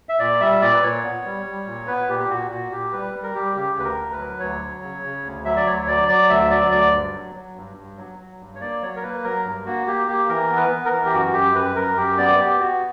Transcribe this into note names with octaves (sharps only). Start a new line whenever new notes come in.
E5
A#2 D5
G3 E5
A#2 D5
B4
A#2 C#5
B3
G3
G3
A#2
B3 B4
A#2 G4
G4
A#2 F#4
A#2 F#4
A#2 G4
G3 B4
G3
A#4
G3 G4
C#3 G4
D2 B4
A#4
D2
B4
F#3
D2 C#5
F#3
C#3
C#3
D2
F#3 E5
D5
D2 C#5
F#3 D5
F#3 D5
D2 E5
F#3 D5
D2 D5
G2
F#3
F#3
G2
G2
F#3
F#3
G2
C#5
A#3 D5
F#3 C#5
A#4
A#3 B4
F#3 A#4
G2
A#3 F#4
A#3 G4
A#3 G4
E3 A#4
B3
B4
B3
A#4
E3
G4
F#2 F#4
F#2 G4
F#2 B4
F#2 A#4
F#2 G4
B3 D5
B3 G4
B3 F#4